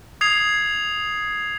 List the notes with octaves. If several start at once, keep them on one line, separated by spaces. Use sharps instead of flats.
D#6 G#6 C7 F7